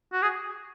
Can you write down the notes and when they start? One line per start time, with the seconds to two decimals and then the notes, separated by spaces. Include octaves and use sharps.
0.13 F#4
0.22 G#4